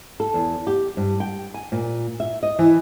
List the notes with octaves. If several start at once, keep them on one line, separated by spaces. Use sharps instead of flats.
A4
E2
G4
G2
G5
G#5
A#2
E5
D#5
E3